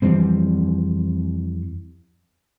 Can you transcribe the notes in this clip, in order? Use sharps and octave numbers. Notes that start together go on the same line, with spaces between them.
F2 E3 G3 C4